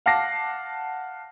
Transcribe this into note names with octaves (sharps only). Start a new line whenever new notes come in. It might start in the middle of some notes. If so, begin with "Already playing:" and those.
F5 F#5 A5 D6 A#6 C7